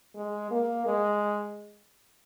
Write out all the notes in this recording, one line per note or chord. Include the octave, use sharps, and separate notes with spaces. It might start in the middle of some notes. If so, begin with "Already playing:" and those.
G#3
A#3
G#3